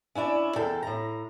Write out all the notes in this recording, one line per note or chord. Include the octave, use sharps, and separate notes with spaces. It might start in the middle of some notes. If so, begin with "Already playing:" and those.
C#4 D4 E4 D5
E2 A4 G5
A2 A#5